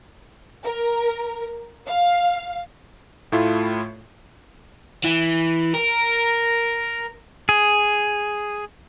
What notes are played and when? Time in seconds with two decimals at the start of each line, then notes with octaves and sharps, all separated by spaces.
0.63 A#4
1.87 F5
3.32 A2 A3 E4 F4
5.04 E3
5.74 A#4
7.49 G#4